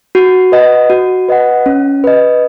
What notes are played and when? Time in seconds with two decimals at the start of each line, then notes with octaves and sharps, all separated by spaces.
0.15 F#4
0.52 B4 D#5 F#5
0.90 F#4
1.29 B4 D#5 F#5
1.66 C#4
2.04 B4 D#5